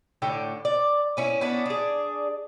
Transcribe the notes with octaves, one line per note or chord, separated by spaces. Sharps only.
A2 D3 G5
D5
B3 C#4 E4
B3 C#4 D4 E4
D4 G#4